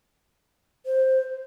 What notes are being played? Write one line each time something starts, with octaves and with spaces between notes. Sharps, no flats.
C5